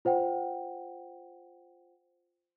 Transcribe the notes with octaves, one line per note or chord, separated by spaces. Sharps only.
F4 C5 F#5 G5